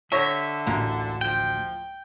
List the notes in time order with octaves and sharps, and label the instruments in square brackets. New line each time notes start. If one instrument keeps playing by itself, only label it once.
[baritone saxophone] D3 [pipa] G4 A4 C#5 [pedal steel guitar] E5 [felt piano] E6 A#6 B6
[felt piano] A1 D2 [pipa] G#3 A#3 F4
[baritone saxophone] F3 [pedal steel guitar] G5